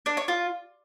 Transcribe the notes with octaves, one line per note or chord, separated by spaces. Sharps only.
D4
C#5
F4